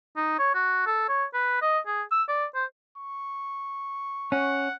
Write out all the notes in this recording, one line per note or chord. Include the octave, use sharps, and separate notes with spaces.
D#4
C#5
F#4
A4
C#5
B4
D#5
G#4
E6
D5
C5
C#6
C#4 F#5